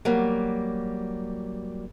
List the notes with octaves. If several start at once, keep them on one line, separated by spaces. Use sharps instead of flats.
F#3 G3 A#3